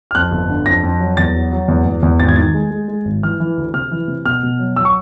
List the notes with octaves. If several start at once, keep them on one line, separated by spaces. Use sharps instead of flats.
F6
F2 F#6
G1
D3
F2 A#6
F2
F#3
E2 A6
F#3
F#3
E2
E2
E2
G#1 A6
G#6
D#3 A6
G#3
G#3
G#3
G#1
E3 F6
E3
D2
C3 F6
E3
C3
B2 F6
B2
F#3
F#3 E6
C#6